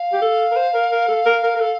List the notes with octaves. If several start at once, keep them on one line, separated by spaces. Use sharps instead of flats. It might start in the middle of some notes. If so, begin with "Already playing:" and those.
Already playing: F5
G4
A4
A#4
C5
A#4
A#4
A4
A#4
A#4
A#4
A4